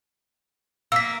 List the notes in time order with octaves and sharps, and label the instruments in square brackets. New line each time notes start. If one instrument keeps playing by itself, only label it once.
[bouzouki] A#3 [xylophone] E6 B6